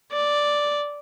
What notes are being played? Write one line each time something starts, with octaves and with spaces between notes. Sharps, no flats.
D5